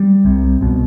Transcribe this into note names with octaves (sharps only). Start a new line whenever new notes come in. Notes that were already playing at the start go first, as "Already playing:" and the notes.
Already playing: G3
C2 C3
C2 B2